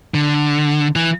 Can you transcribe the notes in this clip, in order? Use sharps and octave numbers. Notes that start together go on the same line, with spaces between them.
D3
E3